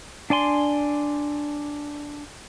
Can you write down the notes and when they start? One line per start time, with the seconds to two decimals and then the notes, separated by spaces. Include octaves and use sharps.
0.30 D4 D5 G#5 C6